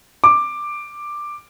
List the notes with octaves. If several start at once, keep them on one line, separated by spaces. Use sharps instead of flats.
D6